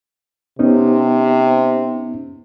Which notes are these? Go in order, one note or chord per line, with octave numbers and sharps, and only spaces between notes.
C3 B3 C#4 D#4